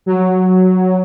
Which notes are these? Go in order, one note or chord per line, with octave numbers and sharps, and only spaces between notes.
F#3